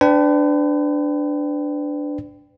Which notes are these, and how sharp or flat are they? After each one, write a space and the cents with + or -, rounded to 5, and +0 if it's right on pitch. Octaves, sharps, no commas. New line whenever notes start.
D4 +0 B4 +40 G5 +0